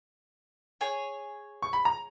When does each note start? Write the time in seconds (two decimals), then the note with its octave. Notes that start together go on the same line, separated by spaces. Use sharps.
0.81 G#4 C#5 G#5
1.62 C#6
1.73 B5
1.85 A#5